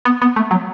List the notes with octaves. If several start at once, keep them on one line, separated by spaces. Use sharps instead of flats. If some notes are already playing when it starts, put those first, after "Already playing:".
B3
B3
A3
F#3